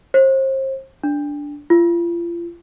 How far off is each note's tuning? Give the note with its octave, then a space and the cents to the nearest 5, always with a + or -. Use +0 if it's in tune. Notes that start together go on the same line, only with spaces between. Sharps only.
C5 +35
D4 -10
F4 -35